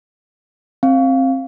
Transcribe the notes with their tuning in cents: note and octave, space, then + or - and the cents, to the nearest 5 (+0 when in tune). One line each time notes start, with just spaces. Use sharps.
C4 +20 F5 +0